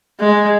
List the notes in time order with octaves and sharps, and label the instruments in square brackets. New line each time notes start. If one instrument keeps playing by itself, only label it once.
[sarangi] G#3